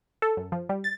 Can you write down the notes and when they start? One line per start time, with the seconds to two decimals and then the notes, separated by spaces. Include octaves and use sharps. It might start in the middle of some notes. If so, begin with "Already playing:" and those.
0.22 A4
0.37 F#2
0.52 F3
0.69 G3
0.84 A6